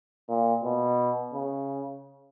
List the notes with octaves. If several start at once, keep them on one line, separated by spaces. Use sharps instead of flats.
A#2
B2
C#3